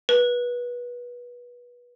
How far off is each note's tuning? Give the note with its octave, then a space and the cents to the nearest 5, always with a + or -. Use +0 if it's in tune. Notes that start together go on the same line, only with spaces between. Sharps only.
B4 -25